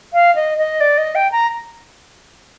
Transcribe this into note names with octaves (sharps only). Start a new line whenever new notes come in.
F5
D#5
D#5
D5
D#5
G5
A#5